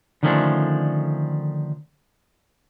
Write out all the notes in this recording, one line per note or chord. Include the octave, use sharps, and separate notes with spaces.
D3 D#3 F3 A3 C#4 D4